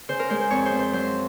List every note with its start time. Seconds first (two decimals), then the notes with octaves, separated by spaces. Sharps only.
0.09 C#3 C5
0.19 A#4
0.30 G#3 C5
0.41 C5
0.51 F2 C#5
0.66 C5
0.72 F2
0.79 C5
0.93 F#3 C5